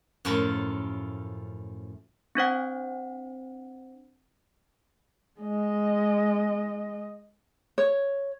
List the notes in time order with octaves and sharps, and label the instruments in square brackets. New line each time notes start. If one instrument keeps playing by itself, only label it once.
[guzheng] F#2 A2 F3 F4 A4 B5
[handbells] C4 D4 C5 F#5
[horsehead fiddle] G#3 D#5
[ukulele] C#5